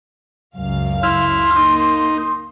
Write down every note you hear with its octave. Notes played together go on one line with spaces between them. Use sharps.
C#2 F#2 F5
E4 C6 F6
A#3 D#4